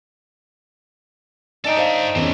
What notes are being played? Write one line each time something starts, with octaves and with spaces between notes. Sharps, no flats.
D4 D#4 A4 D#5 G5 G#5
C5 F5
E2 C4 C#4 E4